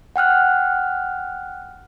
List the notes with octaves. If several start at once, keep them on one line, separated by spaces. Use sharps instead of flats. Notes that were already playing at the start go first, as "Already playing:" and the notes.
F#5 G5 F6 F#6